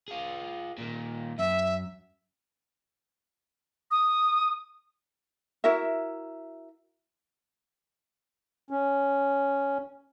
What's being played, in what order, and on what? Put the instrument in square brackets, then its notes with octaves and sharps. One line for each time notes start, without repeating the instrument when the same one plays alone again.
[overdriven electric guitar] F4 G#4
A#2 D#3
[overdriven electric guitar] F#2 [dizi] E5
[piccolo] D#6
[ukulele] E4 F#4 A#4 E5
[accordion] C#4